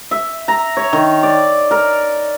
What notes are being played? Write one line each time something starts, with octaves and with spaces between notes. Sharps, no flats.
E5
A#5
C#5
D#3
D5
A#4